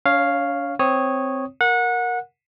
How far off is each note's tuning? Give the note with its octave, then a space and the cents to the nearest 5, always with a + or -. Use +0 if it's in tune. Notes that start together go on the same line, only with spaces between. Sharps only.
C#4 +45 C#5 +0 F5 +0
C4 -10 C#5 -10 D#6 +0
A#4 +0 F#5 -25